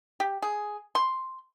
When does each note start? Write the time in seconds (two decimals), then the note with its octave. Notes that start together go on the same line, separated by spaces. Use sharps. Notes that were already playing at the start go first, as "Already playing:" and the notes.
0.20 G4
0.42 G#4
0.95 C6